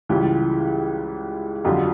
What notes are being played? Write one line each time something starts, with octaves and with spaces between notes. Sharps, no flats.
C#2 C#3 E3 G3 F4 G4
F2 D3 F#3 F4 G4